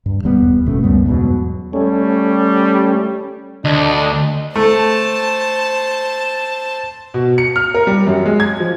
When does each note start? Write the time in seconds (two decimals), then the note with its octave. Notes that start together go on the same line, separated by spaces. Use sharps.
0.06 G2
0.23 E1 D#2 G3 B3
0.66 F#1 B2 A3 C#4
0.83 C#2 F#2 G3 B3
1.06 E2 G#2 B2 F#3
1.73 G3 A3 C#4
3.65 D2 D4 D#5
4.56 A3 C5 A5
7.14 B2
7.38 C#7
7.56 F6
7.75 A#4
7.87 G3
8.07 F#2
8.26 G#3
8.40 G#6
8.60 F3